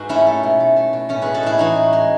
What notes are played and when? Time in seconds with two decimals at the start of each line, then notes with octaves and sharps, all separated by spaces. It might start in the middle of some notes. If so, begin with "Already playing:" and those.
Already playing: G#2 F#4 B4
0.09 A3 C#4 E4
0.26 A3
0.43 B2
0.60 A3
0.76 A3
0.93 B2
1.09 A2 C#4
1.22 G#3 G#4 B4
1.34 F#4 A4
1.43 A2 E4 G#4
1.58 E3 D#4 F#4
1.76 A2
1.93 G#3